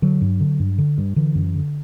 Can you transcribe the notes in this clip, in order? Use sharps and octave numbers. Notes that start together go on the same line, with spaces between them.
D3 F#3
G2
D3
G2
D3
G2
D3 E3
F#2
D3